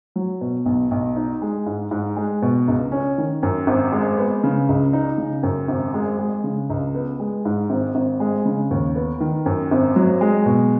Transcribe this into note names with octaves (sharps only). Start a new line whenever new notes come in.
F#3
B2
B1
B1
D#4
G#3
G#2
G#2
G#3
B2
C#2
C#4
D#3
F#2
G#1
G#3
B3
C#3
C#2
D#4
C#3
F#2
G#1
G#3
G#3
C#3
C#2
B3
G#3
G#2
G#1
G#1
G#3
C#3
D#2
B3
D#3
F#2
G#1
F#3
G#3
B2